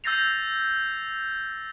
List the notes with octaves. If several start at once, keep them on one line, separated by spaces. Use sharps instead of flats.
E6 G6 A6 A#6 C7 F7